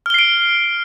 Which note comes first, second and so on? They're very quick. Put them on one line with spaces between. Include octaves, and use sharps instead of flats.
F6 G7 C7 D7